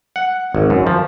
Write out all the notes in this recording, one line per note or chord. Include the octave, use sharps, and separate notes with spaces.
F#5
G#1
F#2
F3